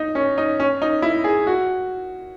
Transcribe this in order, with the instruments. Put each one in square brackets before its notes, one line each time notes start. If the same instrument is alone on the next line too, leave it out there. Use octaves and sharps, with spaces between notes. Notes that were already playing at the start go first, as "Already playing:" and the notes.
Already playing: [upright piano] D#4
C#4
D#4
C#4
D#4
E4
G#4
F#4